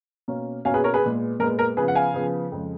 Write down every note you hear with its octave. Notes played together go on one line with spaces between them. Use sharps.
B2 A#3 C#4
B2 A#3 C#4 F5 G#5
G#4 B4
A#4 C#5
G#4 B4
A#2 G#3 B3
A#2 G#3 B3 A#4
A#4
C#3 F3 B3 G#4 B4
F#5
F5 G#5
C#3 F3 B3
F2 C#3 G#3